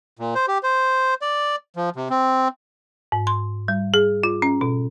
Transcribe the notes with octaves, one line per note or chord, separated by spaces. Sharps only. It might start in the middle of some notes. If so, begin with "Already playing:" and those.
A#2
C5
G4
C5
D5
F3
C3
C4
G#2
C6
G3
G#4
F4
C#4
B2